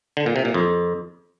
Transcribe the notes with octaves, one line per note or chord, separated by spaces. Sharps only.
D3
A#2
C3
A#2
F2